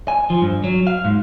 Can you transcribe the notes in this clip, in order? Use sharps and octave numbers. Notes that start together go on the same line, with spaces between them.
G#5
F3
G2
F#3
F5
G#2